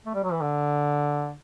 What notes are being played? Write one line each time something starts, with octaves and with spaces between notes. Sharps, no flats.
A3
G3
F#3
E3
D3